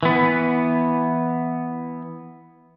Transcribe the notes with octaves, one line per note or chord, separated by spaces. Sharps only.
E3 B3